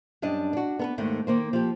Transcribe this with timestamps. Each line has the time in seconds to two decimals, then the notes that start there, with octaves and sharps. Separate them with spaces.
0.22 F#2 G3 D4 D#5
0.53 D4 F#4
0.79 B3 A#4 B4
0.98 D#2 G#2 D#3 A3
1.27 D#3 A#3 C5
1.53 F3 G4